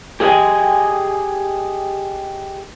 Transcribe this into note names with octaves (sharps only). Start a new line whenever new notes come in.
G4 G#4 D#5 E5 G5 G#5